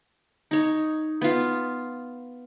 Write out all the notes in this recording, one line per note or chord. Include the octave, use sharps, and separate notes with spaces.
D#4 C#5
B3 F4